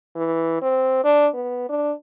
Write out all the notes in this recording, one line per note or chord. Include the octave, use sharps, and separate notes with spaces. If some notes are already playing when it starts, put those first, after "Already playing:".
E3
C4
D4
B3
D4